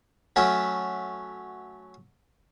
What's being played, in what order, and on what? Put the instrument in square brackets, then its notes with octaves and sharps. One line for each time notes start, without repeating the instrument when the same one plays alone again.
[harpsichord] F#3 A3 C#4 E5